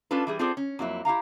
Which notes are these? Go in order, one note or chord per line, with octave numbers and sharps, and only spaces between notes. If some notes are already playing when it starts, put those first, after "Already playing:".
C#4 D4 F4 A4 B4
E3 G3 G#4
C4 F4 G#4 A4 C5 D5
C#4
F2 F#3 A#3 E4
E4 G4 F5 A#5